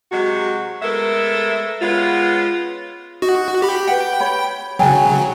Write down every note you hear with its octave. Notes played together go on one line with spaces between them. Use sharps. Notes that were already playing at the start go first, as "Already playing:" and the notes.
C3 F#3 G#3 F#4
G#3 A3 B3 A4 A#4 E5
G#3 B3 C#4 F4
D#4 F#4
G4 B5
B4 F#5 G5
C#5 B5
C#3 F#3 G5 G#5 A#5